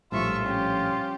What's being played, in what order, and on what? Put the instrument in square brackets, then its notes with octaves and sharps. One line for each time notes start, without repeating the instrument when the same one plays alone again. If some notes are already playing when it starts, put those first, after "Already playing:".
[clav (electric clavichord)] A#1 A2 [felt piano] F3 G3 [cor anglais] F4 [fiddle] E5 C#6
[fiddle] C#4 G4